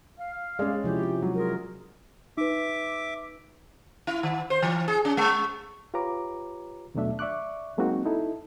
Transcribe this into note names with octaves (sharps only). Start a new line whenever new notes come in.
F5
G#3 C#4 D5
C3 F3 E4 G4
F#3 G#3
F4 G#4 A#4
D#4 B4 E5 D6
E4
D#3
C5
E3
G#4
C#4
G#3
F4 G4 B4 C#5 A#5 D6
D#2 B2 F#3 A3 D4 E5
D5 E5 C#6 D6 F#6
F#3 G#3 A#3 C4 D#4 F#4
D#4 E4 A4